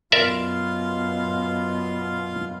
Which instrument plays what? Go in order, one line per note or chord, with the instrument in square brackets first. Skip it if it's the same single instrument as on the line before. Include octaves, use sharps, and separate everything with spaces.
[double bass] F#2 B2 [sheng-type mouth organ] F4 F5 C6 [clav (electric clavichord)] A#4 D5 E5